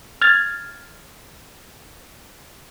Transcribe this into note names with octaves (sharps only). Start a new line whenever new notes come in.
F6 G#6 A6